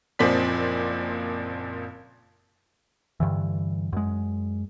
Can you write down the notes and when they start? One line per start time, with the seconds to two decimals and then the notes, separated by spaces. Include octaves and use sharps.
0.19 F#1 A#2 F3 C4 D5 B6
3.20 G2 D3 E3
3.93 F#2 G#3